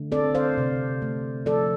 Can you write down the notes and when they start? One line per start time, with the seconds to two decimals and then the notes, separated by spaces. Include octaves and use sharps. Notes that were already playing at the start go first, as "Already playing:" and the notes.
Already playing: D3 A3
0.12 C4 A4 D5
0.35 C5 F5
0.58 C3
1.02 A3
1.46 F3 A4 D5